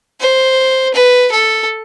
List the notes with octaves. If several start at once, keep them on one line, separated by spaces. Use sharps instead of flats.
C5
B4
A4